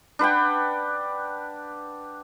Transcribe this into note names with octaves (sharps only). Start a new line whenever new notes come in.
D4 B4 F#5 G5